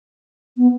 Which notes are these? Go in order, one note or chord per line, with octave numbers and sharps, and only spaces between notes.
B3